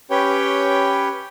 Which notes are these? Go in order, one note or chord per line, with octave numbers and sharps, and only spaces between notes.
C#4 G4 B4 C#5 G5